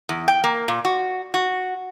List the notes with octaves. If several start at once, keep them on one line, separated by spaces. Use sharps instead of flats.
E2
G5
A#3
A#2
F#4
F#4